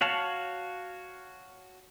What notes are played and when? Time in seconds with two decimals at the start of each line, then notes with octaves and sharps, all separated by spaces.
0.01 F#4 C#5 F5 A5